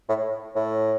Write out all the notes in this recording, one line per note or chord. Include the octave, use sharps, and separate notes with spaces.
A2
A2